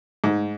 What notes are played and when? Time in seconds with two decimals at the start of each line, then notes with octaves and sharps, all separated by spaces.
0.24 G#2